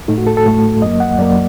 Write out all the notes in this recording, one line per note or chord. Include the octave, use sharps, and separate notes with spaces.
A2 A3 D#4
F#4
A4
A4
A2 A3
F#2 F#3 A#3 D#5
F#5
F#2 F#3 A#3 D5